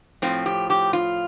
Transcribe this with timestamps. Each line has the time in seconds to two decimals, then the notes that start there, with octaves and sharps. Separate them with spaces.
0.22 A2 F3 C4
0.46 G4
0.70 G4
0.93 F4